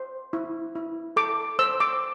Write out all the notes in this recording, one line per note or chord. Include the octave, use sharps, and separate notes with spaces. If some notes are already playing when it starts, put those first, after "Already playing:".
Already playing: C5
E4
E4
A4 D6
C5 E6
D6